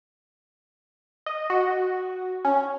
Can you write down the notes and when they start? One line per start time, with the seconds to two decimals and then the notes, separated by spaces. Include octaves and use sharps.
1.26 D#5
1.50 F#4
2.45 C#4